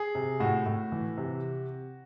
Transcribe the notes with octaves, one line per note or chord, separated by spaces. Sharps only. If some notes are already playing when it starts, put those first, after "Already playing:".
Already playing: G#4
C3
A2 F#4
A2
E3
C3